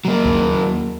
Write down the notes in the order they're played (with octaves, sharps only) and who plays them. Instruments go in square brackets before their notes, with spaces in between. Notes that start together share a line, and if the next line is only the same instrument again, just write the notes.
[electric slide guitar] F#3 A#3
[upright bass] D#2